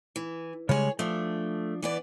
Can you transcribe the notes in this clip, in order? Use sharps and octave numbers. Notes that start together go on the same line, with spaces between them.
E3
C#3 G3 G#3 G#4 C#5
F3 A3 D4
E3 B3 D5